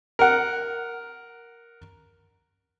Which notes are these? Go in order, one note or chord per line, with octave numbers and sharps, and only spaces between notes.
A#4 F#5